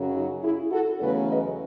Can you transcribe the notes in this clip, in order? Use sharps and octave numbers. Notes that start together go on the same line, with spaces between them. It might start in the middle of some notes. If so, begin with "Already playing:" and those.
Already playing: F#2 C#3 F#3
D#4 F#4
E4 G#4
F#4 A4
E2 C#3 F#3 A3 C#4 G#4 B4
B4 D#5